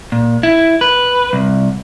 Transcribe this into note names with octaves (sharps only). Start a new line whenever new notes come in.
A#2
E4
B4
C2